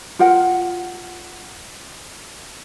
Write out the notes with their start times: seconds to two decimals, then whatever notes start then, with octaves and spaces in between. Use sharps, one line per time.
0.19 F4 A#4 F#5 G5